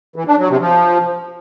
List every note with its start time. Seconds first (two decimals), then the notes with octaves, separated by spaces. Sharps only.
0.16 E3
0.27 D4
0.38 F#3
0.49 C3
0.61 F3